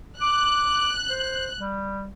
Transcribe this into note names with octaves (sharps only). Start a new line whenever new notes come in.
D6 F#6
C5
G3